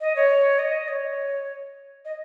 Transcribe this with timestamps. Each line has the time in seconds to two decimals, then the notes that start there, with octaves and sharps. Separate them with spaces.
0.01 D#5
0.16 C#5
0.59 D#5
0.88 C#5
2.05 D#5